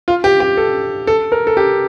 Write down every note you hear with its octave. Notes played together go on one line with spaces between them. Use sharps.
F4
G4
G4
A4
A4
A#4
A4
G4